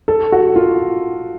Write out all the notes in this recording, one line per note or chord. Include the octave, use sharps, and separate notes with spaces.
A4
F#4
F4